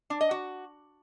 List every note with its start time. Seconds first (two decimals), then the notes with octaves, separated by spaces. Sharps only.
0.10 D4
0.21 D#5
0.31 F#4